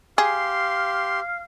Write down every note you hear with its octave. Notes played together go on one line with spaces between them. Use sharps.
G4 G#4 F5 C6